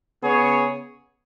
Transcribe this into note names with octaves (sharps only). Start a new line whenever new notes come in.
C#3 B3 G#4 C#5